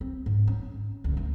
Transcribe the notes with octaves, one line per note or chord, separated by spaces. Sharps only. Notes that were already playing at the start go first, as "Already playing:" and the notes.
C4
G#2
C#4
D2
A3